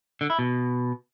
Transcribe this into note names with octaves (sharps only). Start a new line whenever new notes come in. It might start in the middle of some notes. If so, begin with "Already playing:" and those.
D3
E4
B2